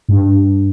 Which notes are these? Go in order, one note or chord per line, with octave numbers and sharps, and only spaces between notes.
G2